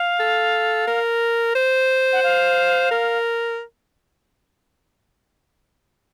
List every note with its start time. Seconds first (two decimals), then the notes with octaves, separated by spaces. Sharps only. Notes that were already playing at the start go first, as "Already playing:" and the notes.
Already playing: F5
0.20 A4
0.87 A#4
1.55 C5
2.13 F#5
2.23 F5
2.91 A#4